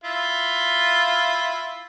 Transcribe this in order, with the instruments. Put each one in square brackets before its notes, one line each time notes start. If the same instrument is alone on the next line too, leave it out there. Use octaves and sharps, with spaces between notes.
[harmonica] E4 F4